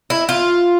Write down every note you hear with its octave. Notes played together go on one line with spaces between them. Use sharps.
E4
F4